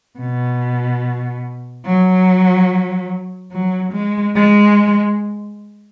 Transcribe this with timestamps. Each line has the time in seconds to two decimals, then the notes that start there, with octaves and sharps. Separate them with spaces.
0.19 B2
1.85 F#3
3.52 F#3
3.93 G#3
4.35 G#3